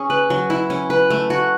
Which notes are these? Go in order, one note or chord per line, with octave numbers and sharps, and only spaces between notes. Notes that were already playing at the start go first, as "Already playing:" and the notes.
Already playing: C#4 G#4
B4
F#3
E4
C#4
B4
A3
F#4